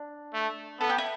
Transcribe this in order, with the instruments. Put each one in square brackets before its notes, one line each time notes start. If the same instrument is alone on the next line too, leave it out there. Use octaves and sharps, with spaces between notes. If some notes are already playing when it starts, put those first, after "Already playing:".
Already playing: [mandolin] D4
[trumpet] A3
[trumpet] B3 [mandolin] A4
[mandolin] G4
E4